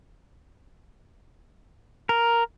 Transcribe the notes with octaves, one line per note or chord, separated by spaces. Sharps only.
A#4